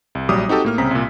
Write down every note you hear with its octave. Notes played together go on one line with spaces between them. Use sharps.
C2
A#1 F#3 G3 D6 D#6
C4 D#4 F#4 G4 A4
A2 A#3 F6
C2 C#3 C4 A#5 B6
C2 A#2